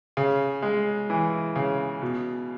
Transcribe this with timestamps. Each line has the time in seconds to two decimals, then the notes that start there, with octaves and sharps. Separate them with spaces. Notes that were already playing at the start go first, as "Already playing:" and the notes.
0.17 C#3
0.62 G#3
1.10 E3
1.56 C#3
2.02 B2